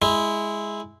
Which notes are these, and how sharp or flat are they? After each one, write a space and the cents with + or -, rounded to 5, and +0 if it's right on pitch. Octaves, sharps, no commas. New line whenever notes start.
G#3 +0 E4 -15